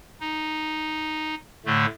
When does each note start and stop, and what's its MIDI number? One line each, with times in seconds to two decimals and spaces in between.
0.20 1.35 63
1.66 1.86 45
1.66 1.86 50
1.66 1.86 57